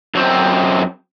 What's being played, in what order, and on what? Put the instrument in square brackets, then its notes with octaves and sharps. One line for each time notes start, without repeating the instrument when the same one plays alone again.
[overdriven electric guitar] F#2 C4